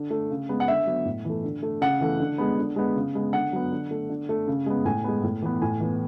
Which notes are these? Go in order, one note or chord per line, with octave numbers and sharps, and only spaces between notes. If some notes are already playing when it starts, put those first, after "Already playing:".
Already playing: D3
A3
C#3
G#3 B3
F#5
D3 E5
F#3 B3
A2
E3 A3
D3
A3
C#3 F#5
E3 A3
D3
G#3 B3
D3
G#3 B3
C#3
G#3 B3
D3 F#5
F#3 B3
D3
A3
D3
A3
C#3
G#3 B3
A2 G#5
G#3 B3
A2
E3 B3
A2 G#5
E3 B3